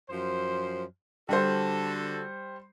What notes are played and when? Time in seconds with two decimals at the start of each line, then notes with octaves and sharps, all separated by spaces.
0.10 F#2 F3 C5
1.29 D3 G3 F#4 A4 C5